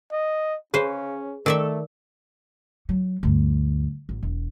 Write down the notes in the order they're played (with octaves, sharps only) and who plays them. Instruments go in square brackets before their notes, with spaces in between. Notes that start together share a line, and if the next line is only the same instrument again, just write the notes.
[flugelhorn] D#5
[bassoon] C#3 [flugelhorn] C#4 [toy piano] G#4 [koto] B4 C5
[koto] D#3 D5 E5 [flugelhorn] A3 [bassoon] A4 [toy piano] A#4
[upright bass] F#3
D2 G2
A1
E1